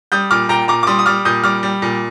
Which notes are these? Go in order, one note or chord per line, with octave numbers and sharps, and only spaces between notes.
G3 D#6 G6
A#2 D6 F6
A#2 G5 A#5
A#2 A#5 D6
D6
G3 C6 D#6
D#6
G3 D6 F6
A#2 D#6 G6
G3 D6 F6
G3
A#2